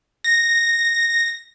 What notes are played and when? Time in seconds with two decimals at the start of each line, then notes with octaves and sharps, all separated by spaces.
0.24 A#6